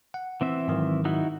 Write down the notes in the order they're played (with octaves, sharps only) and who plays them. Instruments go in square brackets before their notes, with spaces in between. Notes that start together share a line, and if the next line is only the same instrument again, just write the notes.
[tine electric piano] F#5
[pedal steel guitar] E3 C4 E5
[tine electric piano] G#2 D#3 F#3
[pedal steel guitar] D#4 E4 F#4